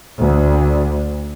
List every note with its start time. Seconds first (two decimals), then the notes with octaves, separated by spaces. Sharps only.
0.18 D2